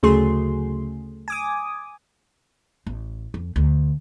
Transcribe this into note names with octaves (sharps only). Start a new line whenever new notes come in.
D2 C#3 F#3 A3 G#4 C6
G#5 D6 D#6
A1
F2
D2